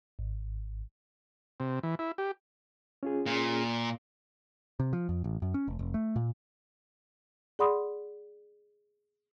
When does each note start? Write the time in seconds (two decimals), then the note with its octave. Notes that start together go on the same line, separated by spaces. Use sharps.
0.19 G#1
1.60 C3
1.83 E3
1.99 E4
2.18 G4
3.03 C#4 F4 G#4
3.26 A#2
4.80 C3
4.93 F3
5.09 F2
5.24 A1
5.42 F#2
5.54 C#4
5.68 F1
5.79 F1
5.94 A3
6.16 A#2
7.59 G#4 D5 F#5 B5 C6 D#6